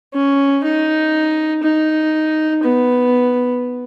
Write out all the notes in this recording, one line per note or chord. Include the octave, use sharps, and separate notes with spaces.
C#4
D#4
D#4
B3